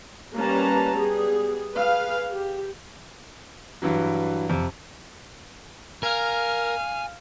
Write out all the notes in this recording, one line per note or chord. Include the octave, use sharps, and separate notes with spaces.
G3 A#3 C#4 B4 A5 A#5
G3 B3 G#4
G#4 B4 F5
G4
G2 E3 F#3
F2 C3
A#4 F5 G#5